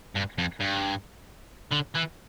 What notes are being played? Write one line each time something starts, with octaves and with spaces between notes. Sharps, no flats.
G2
F2
G2
D3
E3